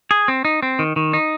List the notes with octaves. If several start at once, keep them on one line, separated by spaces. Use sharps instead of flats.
G#4
C4
D#4
C4
D#3
D#3
D#4